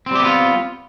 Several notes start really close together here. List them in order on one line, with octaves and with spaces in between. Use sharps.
C4 G3 G4 B3 F4